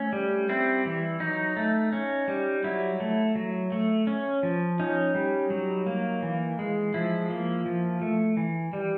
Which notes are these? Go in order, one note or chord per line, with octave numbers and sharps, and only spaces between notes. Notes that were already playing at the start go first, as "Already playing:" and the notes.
Already playing: A3 C#4
G3
C4 E4
E3
F#3 D#4
A3
C#4
G3
F#3 E4
A3
F#3
A3
C#4
F3
C#4 D#4
G3
F#3
A#3
E3
G#3
F3 E4
A#3
F3
A3
E3
G3